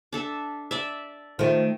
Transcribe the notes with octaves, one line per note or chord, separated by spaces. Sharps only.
D4 A4 E5
D5 E5
D#3 F3 A3